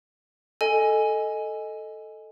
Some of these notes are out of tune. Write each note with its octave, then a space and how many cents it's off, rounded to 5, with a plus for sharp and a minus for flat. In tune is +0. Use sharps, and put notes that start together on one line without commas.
A4 +0 D#5 +0 G#5 +0